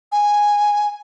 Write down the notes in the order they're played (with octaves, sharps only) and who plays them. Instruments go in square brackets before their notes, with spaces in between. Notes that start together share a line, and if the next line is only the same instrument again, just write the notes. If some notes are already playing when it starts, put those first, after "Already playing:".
[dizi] G#5